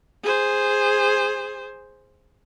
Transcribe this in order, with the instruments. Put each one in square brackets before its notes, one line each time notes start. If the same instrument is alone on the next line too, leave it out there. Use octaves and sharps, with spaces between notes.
[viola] G#4 C5